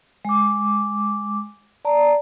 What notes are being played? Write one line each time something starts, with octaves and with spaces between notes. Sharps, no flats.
G#3 D6
D5 A5 A#5